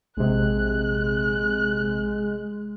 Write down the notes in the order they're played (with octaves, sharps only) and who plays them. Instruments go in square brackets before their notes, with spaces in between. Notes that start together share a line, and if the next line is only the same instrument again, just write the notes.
[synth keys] A#1 C3 [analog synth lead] G#3 [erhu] F#6